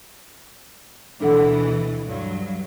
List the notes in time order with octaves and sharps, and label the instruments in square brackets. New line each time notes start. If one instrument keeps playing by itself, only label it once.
[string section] D2 B2 E3 [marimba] D4 A4 F#5
[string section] G2 F#3